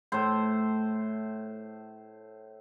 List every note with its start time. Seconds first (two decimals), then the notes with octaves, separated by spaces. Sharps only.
0.12 A2 C5